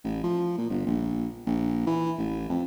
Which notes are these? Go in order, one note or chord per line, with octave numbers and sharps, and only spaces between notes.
A1
F3
A#2
G1
A#1
A#1
E3
A1
F2